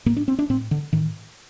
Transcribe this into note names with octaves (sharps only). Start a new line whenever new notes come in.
A2 A#3
D4
C4
D4
A2 C4
D3
A2 D#3